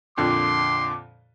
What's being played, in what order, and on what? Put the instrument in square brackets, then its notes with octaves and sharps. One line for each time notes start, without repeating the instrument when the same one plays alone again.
[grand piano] F2 A#2 D3 [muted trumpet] C6 [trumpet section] D6